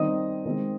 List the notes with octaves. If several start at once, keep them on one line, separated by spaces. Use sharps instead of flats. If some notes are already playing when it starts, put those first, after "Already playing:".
Already playing: D#3 G3 C4 D#4 D#5 D#6
D#3 G#3 C4